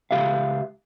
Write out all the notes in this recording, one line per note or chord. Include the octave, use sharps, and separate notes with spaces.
C#2 C3 G4 E5 F5